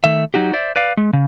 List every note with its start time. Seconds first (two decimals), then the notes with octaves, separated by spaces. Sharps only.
0.04 D#3 A3 E5
0.34 F#3 D#4 F#4 G4
0.53 C5 D5 E5
0.76 B4 D5 F5
0.97 G#3
1.13 C#3